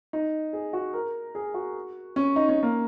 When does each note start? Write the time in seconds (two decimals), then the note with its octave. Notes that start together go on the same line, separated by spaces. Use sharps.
0.13 D#4
0.53 G#4
0.73 F#4
0.94 A#4
1.35 G#4
1.54 F#4
2.16 C#4
2.36 D#4
2.49 C#4
2.63 A#3